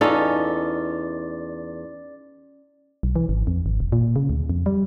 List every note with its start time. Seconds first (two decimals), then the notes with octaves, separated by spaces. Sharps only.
0.01 E2 C#4 D#4 F4 A4 D5
3.03 B1
3.16 E3
3.29 G#1
3.47 F2
3.66 G#1
3.80 E1
3.92 A#2
4.16 C#3
4.30 D2
4.50 F2
4.66 G3